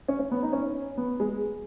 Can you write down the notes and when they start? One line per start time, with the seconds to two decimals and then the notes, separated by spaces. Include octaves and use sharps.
0.08 C#4
0.19 C#4
0.31 B3
0.42 D#4
0.53 C#4
0.97 B3
1.20 G#3